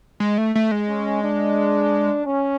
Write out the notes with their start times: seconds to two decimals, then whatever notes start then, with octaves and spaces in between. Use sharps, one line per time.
0.20 G#3
0.38 A3
0.55 A3
0.71 G#3
0.89 C#4
1.23 D4
2.25 C#4